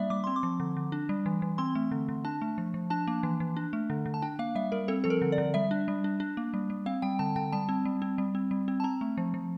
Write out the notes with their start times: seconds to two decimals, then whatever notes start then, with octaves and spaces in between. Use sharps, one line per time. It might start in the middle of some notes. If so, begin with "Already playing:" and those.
Already playing: G3 A#3 D4 D5 E5
0.10 G3 D6
0.24 C4 C6
0.36 D6
0.43 F3
0.60 D3
0.77 D3
0.92 D4
1.09 G3
1.26 E3
1.42 E3
1.58 C4 C6
1.75 A3
1.91 D3
2.09 D3
2.25 D4 A5
2.42 A3
2.58 F3
2.74 F3
2.90 D4 A5
3.07 A#3
3.23 E3
3.40 E3
3.57 D4
3.73 A3
3.90 D3
4.06 D3
4.14 A5
4.22 D4 G5
4.39 A#3 F5
4.55 G3 E5
4.72 G3 A#4
4.88 C4 A4
5.04 F3 A4
5.10 A#4
5.22 D3
5.32 D5
5.38 D3
5.54 G3 E5
5.71 D4
5.88 G3
6.04 D4
6.20 D4
6.37 A#3
6.54 G3
6.70 G3
6.86 C4 F5
7.02 G3 G5
7.19 D3 A5
7.36 D3 G5
7.52 G3 A5
7.69 C4
7.85 G3
8.02 C4
8.18 G3
8.35 C4
8.51 G3
8.68 C4
8.80 A5
8.84 C4 A#5
9.01 A3
9.18 F3
9.34 F3